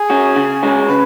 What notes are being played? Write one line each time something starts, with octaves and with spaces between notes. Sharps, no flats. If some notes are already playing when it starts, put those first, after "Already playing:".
Already playing: G#4
C#4 F#4
C#3
G#3 C#4 F#4
C#3 B4